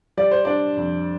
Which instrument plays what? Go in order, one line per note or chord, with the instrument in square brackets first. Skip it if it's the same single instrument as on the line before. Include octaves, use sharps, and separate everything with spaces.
[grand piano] G3 D5
C5
D4 D5
F2